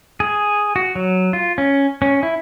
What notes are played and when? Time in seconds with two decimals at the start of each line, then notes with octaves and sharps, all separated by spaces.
0.20 G#4
0.76 F#4
0.95 F#3
1.33 F4
1.58 C#4
2.02 C#4
2.23 E4